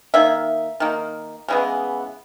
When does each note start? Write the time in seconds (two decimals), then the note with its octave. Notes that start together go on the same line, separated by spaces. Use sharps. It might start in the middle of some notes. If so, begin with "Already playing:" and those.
0.14 D#3 A#3 E5
0.80 D#3 A#3
1.48 C#3 E3 G#3 B3